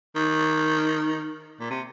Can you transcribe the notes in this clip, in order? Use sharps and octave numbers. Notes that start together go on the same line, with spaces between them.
D#3
A#2
C3